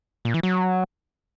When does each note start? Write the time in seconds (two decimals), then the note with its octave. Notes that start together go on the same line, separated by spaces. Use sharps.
0.25 A#2
0.34 E3
0.43 F#3